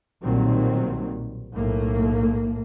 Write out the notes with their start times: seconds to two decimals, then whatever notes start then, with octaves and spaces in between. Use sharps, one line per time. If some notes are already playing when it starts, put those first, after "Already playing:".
0.23 B1 A#2 D#3 F#3 G3 C4
1.55 B1 A2 A3 A#3